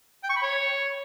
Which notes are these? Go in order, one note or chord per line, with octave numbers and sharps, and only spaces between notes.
G5
C#6
B5
C#5